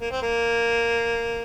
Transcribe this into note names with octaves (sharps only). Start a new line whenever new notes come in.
A#3
C4
A#3